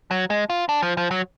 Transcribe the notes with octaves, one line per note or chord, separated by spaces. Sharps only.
F#3
G#3
F4
D4
F3
F3
F#3